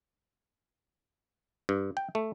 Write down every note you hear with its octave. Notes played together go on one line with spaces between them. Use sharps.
G2
G5
A3